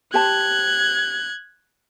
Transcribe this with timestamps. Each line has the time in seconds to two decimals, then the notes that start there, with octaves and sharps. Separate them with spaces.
0.14 G4 C5 A5 F#6 G#6